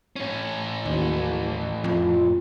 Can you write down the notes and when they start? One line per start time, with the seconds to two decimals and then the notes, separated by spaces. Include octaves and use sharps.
0.16 A2 C#4
0.85 F#1 D#2
1.84 F2 F4